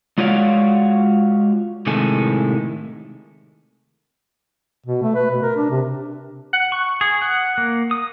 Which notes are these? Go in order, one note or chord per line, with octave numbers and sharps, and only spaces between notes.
G#3 F4 F#4 C#5 D5 F5
A2 C3 D#3 G#3 A4 G#5
B2
A3
B4
B2
A#4
D4
C3
F#5
C#6
G#4
F#5
A#3
D#6